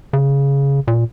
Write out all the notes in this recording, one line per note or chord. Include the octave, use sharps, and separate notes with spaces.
C#3
A#2